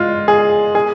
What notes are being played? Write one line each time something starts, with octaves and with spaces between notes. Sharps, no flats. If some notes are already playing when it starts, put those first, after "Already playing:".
Already playing: G#3 F4
G#4
G#4